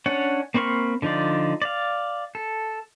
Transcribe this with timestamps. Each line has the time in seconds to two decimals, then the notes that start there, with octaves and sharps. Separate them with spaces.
0.06 C#4 D4 C#5 F#5
0.54 A#3 C4 B5 C#6 F6
1.02 D3 F3 D#4 F4 D5
1.62 D5 F5
2.35 A4